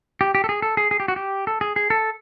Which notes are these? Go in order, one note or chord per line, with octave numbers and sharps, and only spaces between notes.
G4
G4
A4
G#4
A4
G#4
G#4
G4
F#4
G4
A4
G#4
G#4
A4